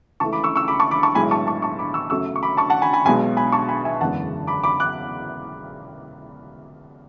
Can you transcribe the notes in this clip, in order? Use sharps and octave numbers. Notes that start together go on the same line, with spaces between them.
C#2 C#3 E3 A3 A5 C#6
B5 D6
C#6 E6
C#6 E6
B5 D6
A5 C#6
B5 D6
A5 C#6
B1 A2 G#3 G#5 B5
A5 C#6
A5 C#6
A5 C#6
B5 D6
C#6 E6
F#2 C#3 F#3 A3 C#6 E6
C#6
B5 D6
A5 C#6
F#5 A5
G#5 B5
G#5 B5
B1 B2 G#3 G#5 B5
G#5 B5
A5 C#6
G#5 B5
E5 G#5
F#1 E2 D3 G#3 F#5 A5
B5 D6
B5 D6
D6 F#6